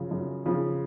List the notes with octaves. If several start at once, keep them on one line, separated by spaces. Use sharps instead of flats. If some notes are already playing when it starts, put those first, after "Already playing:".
Already playing: F#2 C#3 F3
F#2
C#3 F3